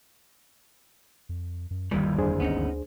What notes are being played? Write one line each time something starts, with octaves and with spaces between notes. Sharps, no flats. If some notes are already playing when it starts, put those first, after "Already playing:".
F2
F#2
G1 D#2 D#3 E3 G3
F2 D4 G#4 C5
D2 B3 C#4 D#4